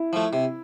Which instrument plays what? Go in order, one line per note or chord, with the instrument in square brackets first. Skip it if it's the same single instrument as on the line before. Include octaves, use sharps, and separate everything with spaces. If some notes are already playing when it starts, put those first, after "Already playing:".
Already playing: [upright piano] E4
[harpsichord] F3 A3
C3